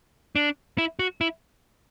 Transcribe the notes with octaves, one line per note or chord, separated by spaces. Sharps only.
D4
E4
F#4
E4